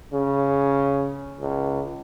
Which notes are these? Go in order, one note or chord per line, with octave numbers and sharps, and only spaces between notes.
C#3
C#2